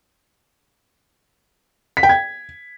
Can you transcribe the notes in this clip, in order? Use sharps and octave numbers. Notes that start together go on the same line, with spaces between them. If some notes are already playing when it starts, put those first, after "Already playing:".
B6
G5
G#6